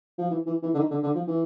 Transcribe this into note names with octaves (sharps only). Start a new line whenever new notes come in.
F3
E3
E3
E3
D3
D#3
D3
D3
F3
E3